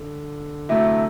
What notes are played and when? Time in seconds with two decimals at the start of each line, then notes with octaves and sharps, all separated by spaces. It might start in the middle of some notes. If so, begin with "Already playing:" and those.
Already playing: D3
0.69 C3 F#3 A3 E4